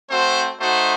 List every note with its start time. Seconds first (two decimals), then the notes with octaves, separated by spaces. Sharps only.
0.09 A3 C4 F#4 C5
0.59 A3 D#4 F#4 C5